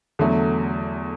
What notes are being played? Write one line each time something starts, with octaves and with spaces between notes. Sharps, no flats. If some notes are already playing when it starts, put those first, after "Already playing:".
E2 D3 F#3 A3